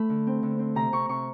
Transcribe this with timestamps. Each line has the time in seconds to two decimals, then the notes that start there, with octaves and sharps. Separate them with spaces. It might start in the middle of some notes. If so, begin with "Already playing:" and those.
Already playing: A3 B5
0.09 D3
0.27 C4
0.43 D3
0.59 C4
0.75 C3 A#5
0.92 C3 C#6
1.09 C3 C#6